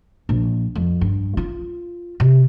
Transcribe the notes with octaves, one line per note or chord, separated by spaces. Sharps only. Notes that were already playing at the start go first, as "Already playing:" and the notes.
A#1
F2
G2
F4
C3